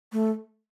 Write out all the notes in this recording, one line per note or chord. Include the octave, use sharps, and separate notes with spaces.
A3